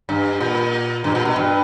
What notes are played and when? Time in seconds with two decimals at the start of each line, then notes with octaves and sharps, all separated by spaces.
0.09 G2
0.40 A#2
1.04 G2
1.15 A#2
1.25 B2
1.36 G2